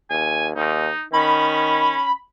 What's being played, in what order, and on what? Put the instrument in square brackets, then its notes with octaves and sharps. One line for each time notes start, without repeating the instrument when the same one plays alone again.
[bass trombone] D#2 [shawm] G#5
[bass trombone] D#2 [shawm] D#4
[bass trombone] D#3 [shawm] C#4 [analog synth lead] B5